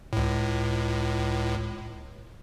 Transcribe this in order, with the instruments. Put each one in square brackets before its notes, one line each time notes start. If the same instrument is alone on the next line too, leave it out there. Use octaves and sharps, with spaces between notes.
[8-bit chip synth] C#2 A2